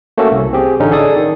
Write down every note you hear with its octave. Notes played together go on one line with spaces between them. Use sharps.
A3 A#3 C#4 F#4 A4
C2
C4 G4 G#4
A1 D3 C#4 D#4
G#4 A4 D5 G#5 D#6
D#3